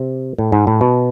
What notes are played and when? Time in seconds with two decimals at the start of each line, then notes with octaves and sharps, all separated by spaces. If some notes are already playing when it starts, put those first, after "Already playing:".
Already playing: C3
0.38 A2
0.52 G#2
0.67 A2
0.81 B2